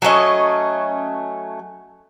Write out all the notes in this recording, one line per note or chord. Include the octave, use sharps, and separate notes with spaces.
F#3 A3 C#4 D#5